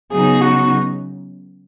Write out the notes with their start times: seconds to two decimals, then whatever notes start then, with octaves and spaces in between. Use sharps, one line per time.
0.12 C#3 F#3 B3 D#4 G#4
0.41 F#4